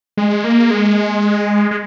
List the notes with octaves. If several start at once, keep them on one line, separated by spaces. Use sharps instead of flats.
G#3
A#3
G#3
G#3